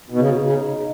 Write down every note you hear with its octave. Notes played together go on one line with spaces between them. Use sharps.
B2 D#4
C#3
B2
C#3